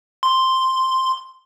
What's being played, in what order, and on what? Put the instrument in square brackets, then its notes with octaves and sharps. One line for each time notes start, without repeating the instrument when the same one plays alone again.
[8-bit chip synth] C6